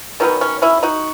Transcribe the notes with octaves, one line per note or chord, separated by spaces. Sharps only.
D#3 F#3 B3 C#4
C#4
C#4 E4
D#4 F#4